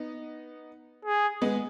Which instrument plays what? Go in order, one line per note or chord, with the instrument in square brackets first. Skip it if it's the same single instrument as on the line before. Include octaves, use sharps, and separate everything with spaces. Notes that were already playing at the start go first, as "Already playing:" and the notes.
Already playing: [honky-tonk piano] B3 D#4
[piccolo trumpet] G#4
[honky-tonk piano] G#3 B3